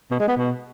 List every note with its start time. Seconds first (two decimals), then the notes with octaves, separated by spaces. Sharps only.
0.11 B2
0.20 G#3
0.28 B3
0.37 B2